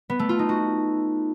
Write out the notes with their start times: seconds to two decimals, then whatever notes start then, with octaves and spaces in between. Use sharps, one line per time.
0.10 B3
0.19 A3
0.29 F4
0.39 D#4
0.49 F#4